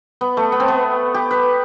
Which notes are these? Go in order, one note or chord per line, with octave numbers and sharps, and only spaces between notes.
B3
A3
B3
C4
B3
G4
B4